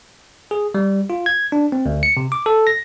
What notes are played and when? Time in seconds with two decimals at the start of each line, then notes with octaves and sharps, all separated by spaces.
0.51 G#4
0.75 G3
1.10 F4
1.26 G#6
1.52 D4
1.72 C4
1.86 D2
2.03 C#7
2.17 C3
2.32 D6
2.46 A4
2.67 A#6